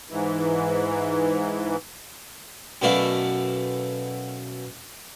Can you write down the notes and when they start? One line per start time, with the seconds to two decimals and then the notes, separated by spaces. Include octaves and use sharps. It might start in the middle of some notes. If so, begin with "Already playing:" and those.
0.10 G#2 E3
2.82 F#2 B2 A3 E4 D5 F5